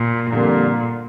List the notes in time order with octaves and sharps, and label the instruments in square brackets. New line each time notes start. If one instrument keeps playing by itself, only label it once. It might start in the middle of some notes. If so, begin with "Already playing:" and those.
Already playing: [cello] A#2
[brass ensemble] F2 D3 G3 A#3 [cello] A#2